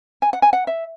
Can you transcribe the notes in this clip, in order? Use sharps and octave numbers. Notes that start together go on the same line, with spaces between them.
G#5
F#5
G#5
F#5
E5